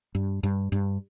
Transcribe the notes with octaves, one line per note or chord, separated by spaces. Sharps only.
G2
G2
G2